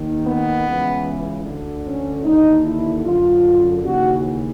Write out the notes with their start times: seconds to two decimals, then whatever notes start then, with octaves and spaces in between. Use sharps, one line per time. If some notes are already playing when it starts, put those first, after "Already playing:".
Already playing: D#2 D#3
0.24 B3
0.65 C#2 C#3 E3
1.44 D2 D3
1.85 C#4
2.25 D#2 D3 D#4
2.64 E4
3.05 F#2 D3 F4
3.84 D#2 C#3 E3 F#4